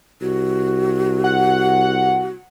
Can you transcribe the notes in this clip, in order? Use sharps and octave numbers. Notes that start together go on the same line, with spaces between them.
C2 F#4
F#5